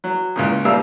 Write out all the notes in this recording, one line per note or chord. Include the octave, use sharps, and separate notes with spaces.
F#3
C#2 A#2 C#3
D#2 A#2 G3 F5 E6